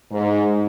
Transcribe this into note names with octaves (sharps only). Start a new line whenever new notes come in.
G#2